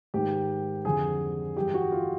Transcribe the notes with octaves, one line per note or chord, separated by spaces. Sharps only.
G#2 D#3 G4
F2 D3 G#4
G2 E3 G4
F#4
F4